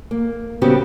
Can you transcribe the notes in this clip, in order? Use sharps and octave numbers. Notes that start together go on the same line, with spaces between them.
A#3
C#3 G3 B3 C4 F#4 G4